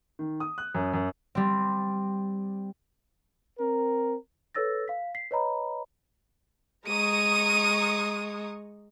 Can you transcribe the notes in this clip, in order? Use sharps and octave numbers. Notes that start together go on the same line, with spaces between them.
D#3
D#6
F#6
F#2
F#2
G3 C4
C4 A#4
A4 B4 C#5 E6 A6 A#6
F5 B6
B6 C7
B4 C#5 D#5 A#5 B5
G#3 A#5 C#6 D#6 D#7